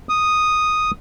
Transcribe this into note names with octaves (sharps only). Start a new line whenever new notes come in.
D#6